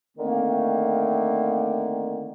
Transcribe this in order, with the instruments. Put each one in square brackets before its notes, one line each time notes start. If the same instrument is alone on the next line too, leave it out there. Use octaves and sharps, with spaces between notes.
[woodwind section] D3 D#3 A3 A#3 C4